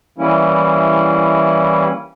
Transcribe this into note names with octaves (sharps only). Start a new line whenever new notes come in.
E3 G3 A#3 C#4 E4